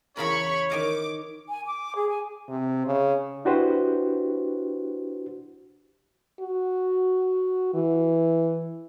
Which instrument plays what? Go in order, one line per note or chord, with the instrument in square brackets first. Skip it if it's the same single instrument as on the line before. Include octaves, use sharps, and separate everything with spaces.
[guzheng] E2 C#3 A#4 [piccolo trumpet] C#5 [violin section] B5 C#6
[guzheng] D#3 D#5 F5 [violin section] D6
[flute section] G#5
D6
G#4
G#5
[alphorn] C3
C#3
[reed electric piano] D4 E4 F#4 G4 B4 C5
[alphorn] F#4
E3